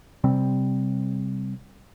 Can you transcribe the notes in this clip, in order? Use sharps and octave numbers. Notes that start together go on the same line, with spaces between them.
C3 G3 C4